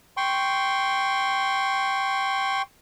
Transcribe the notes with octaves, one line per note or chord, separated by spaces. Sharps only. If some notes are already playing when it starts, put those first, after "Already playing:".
G5 C6 C#6